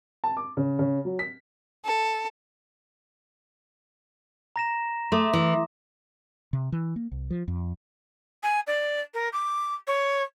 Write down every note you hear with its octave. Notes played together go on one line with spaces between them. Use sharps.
A5
D6
C#3
C#3
F#3
B6
A4
A#5 A#6 E7
A3 C6 D6 D#6
E3
C3
E3
A#3
C2
F3
F2
G#5
D5
A#4
D6
C#5